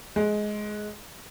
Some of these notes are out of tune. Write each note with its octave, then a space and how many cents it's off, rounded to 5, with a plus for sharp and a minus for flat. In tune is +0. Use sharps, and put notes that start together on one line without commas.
G#3 +15